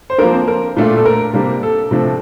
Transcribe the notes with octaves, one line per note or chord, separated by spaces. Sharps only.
C5
F3 A#3 D4 A#4
C4 C5
A#4
A#2 A3 D4 F4
A4
A#4
C3 G3 A#3 D4
A4
C3 F3 A3 D4